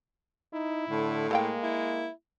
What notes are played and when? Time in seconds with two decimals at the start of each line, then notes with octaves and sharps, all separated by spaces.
0.54 D#4 E4
0.89 A2 D3
1.31 G#3 A#3 A4 F5 G5
1.63 E4